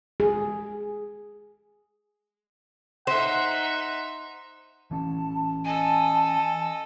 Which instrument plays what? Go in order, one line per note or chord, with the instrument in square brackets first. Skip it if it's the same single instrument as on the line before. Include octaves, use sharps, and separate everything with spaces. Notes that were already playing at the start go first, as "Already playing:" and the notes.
[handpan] G#4
[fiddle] D#4 E5 [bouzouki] C5 [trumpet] F#5
[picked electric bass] E3 C#4 [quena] A5
[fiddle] A4 D#5 [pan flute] G#5 [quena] A5